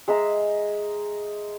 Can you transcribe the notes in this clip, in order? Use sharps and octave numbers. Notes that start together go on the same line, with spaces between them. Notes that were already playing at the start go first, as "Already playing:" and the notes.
G#3 G#4 E5 A#5